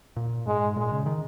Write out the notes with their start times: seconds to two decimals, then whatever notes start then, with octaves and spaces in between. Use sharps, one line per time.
0.16 A#2
0.47 G#2 G#3
0.76 A#2 G#3
0.92 C#3
1.06 D#3